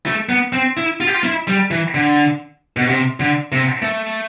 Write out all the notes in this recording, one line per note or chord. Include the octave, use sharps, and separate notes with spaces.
A3
B3
C4
E4
F4
G4
F4
E4
G3
E3
D3
B2
C3
D3
C3
A3